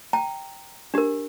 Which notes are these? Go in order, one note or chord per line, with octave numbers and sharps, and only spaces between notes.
G5 A#5
D4 G4 A#4